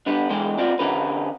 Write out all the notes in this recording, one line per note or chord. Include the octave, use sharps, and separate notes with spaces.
G3 B3 D4
D3 E3 G#3 G5
C4 F4 F#4 D5
D3 C#4 G4 A#4 B4